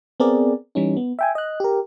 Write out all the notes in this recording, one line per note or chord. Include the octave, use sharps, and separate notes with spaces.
B3 C4 G#4 A#4 D5
E3 G3 C#4 D#4
B3
E5 G5 G#5
D#5 F#6
G4 A#4